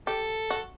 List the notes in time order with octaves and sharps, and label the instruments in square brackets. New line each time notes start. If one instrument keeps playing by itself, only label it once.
[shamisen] G4 [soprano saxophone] A4
[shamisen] F#4